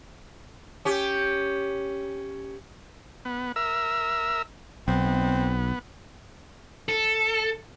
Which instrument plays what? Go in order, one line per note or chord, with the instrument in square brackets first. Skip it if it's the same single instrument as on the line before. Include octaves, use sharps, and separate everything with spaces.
[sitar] C#4 G4
[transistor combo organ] B3
A#4 E5 E6
[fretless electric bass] B1 [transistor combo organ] B3 [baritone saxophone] C4
[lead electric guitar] A4